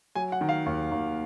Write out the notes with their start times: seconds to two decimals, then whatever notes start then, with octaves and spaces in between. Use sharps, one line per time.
0.15 F#3 G#5
0.32 F#5
0.41 D#3
0.49 F5
0.66 D#2
0.91 D#2